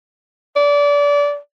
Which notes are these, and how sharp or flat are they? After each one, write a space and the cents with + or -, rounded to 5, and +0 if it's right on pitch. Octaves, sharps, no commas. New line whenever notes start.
D5 -25